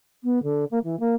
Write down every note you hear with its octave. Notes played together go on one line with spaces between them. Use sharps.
B3
D3
A#3
E3
A#3